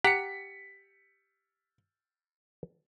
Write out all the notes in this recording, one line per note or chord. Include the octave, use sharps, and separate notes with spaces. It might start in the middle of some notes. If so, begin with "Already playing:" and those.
G4 F#5 A#5 B6 C#7